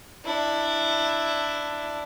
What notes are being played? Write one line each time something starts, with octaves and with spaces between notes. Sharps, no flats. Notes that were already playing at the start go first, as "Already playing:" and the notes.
D4 E4